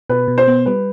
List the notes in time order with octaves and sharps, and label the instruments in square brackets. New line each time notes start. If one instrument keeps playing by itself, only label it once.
[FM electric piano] B2 [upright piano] B4
[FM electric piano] B2
[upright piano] C5
[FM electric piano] B3
[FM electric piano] G3 [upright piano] B4